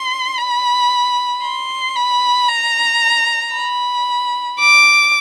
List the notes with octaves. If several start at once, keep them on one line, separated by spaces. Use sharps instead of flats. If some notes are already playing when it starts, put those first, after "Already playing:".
Already playing: C6
B5
C6
B5
A#5
B5
D6